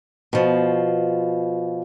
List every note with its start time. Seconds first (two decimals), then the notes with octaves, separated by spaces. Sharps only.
0.33 B2 F3